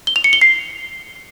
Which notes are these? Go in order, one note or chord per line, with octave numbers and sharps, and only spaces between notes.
G7
F7
C#7
G7
C7